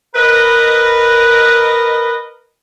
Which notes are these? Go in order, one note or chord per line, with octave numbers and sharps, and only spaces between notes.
A#4 B4 D#5